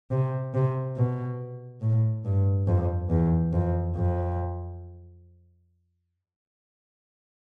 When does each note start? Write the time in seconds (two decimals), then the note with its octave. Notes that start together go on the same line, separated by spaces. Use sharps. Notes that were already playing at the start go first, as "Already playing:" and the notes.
0.11 C3
0.54 C3
0.97 B2
1.82 A2
2.25 G2
2.67 F2
3.10 E2
3.53 F2
3.96 F2